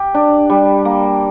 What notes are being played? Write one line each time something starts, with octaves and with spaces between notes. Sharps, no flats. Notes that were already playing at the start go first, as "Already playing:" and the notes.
Already playing: G4
D4
G3
A#3